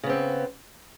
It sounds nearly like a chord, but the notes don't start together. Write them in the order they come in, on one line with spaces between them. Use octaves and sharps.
C#3 B3 C4